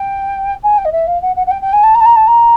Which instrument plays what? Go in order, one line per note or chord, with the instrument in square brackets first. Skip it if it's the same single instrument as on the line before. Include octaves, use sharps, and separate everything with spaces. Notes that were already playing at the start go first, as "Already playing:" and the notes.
Already playing: [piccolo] G5
G#5
G5
D#5
E5
F5
F#5
F#5
F#5
G5
G5
G#5
A5
A#5
A5
A#5
A5
A#5